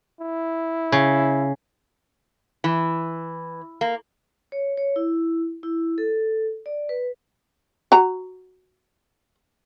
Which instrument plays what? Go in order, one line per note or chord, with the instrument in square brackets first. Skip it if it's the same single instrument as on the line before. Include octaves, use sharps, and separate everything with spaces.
[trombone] E4
[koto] C#3
[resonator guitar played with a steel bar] E3
A#3
[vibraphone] C#5
C#5
E4
E4
A4
D5
B4
[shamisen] F#4 A#5